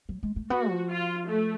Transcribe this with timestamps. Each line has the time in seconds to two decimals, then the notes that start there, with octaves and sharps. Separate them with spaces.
0.09 F#3
0.23 G#3
0.36 A3
0.50 B3 F#4
0.69 F3
0.89 F4
1.27 A3